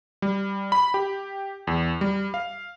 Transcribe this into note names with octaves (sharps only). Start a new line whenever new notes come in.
G3
B5
G4
E2
G3
F5